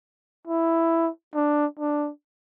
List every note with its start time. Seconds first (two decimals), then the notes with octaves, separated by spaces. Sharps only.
0.48 E4
1.35 D4
1.79 D4